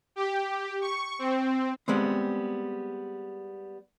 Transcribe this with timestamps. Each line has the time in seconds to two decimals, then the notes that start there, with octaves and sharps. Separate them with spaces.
0.16 G4
0.81 C#6
1.19 C4
1.88 G3 G#3 B3 C4